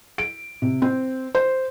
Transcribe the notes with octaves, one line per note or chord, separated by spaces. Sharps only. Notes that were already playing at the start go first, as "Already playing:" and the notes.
D7
C3
C4
C5